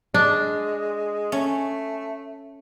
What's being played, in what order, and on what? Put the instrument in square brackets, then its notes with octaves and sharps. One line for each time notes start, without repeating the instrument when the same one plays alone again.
[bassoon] G#3 [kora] D4
[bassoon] A3 [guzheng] C#4